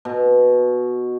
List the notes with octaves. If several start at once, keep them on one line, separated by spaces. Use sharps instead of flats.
B2